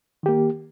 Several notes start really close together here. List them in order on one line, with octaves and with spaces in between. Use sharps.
D#3 G4 A#3